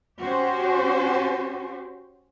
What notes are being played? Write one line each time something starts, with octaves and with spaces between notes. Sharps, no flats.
C#4 F#4 G4 C5